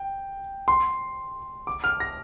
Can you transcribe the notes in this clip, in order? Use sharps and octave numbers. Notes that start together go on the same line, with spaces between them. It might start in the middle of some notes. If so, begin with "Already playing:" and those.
Already playing: G5
C6
D6
F6
A#6